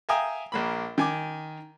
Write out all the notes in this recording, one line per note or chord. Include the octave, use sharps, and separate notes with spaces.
E5 F5 G5 G#5 A#5 D#6
A#1 A#3 B5
D#3 G#5 D6